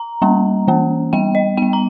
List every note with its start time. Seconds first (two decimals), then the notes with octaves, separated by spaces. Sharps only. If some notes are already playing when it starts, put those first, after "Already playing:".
Already playing: A#5
0.22 G3 A#3 C#4
0.68 E3 A#3 C#4
1.13 G3 B3 G5
1.35 D#5
1.57 G3 B3 G5
1.73 A#5